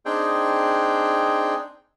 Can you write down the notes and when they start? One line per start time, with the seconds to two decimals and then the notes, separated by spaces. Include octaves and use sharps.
0.06 C4 D4 D#4 G#4 G5